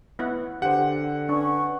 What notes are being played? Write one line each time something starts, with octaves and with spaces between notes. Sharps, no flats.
B3 E4 F#5
D3 G4 C5 F#5
C#4 D4 B4 C#6